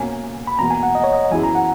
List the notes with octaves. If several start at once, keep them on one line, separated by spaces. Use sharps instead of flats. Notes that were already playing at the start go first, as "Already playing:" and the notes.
Already playing: B2 A#3 C#4 G#5
B5
E2 B2 A#3 A#5
G#5
F#5
D#5
C#5
D#5
F#2 E3 B3 E4 G#4 G#5
A#5
F#5